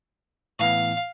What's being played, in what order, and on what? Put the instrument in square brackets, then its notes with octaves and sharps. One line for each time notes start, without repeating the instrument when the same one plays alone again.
[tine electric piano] A2 E3 B3 [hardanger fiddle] F5